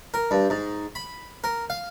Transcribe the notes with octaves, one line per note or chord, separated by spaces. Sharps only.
A#4
G2
G#2
B5
A#4
F5